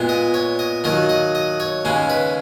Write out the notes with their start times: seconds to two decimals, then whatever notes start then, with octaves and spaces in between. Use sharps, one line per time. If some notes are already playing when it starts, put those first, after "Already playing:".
Already playing: A#2 G#3 B3
0.09 D#5
0.34 C#5
0.59 D#5
0.84 D#2 D#3 F#3 D#5
1.09 D#5
1.35 D#5
1.60 C#5
1.85 D#2 C#3 G#3 C#4
2.10 B4